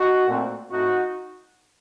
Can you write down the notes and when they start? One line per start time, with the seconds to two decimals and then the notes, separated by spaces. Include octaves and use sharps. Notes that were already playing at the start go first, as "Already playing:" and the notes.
Already playing: D#4 F#4
0.26 A#2 A3 C4
0.70 A2 A3 C4 D#4 F#4